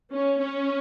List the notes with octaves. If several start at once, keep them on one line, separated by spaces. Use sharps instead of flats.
C#4
C#4